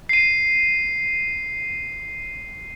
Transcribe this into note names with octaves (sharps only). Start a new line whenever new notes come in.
C7 D#7